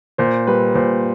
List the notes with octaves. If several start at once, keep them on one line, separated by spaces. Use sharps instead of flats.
A#2 C5
G3 B4
A#2 C5